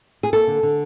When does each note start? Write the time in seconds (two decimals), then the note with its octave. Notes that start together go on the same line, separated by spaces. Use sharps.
0.23 G#4
0.33 A#3 A4
0.47 D3
0.63 D3